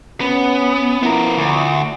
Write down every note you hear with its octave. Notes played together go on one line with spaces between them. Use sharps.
B3 C#4
B2 F3 B3 E4 A#4
D2